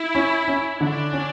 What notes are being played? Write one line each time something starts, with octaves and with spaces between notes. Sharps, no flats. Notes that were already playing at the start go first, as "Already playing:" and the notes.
Already playing: E4
C#4
C#4
D3 D4
C#4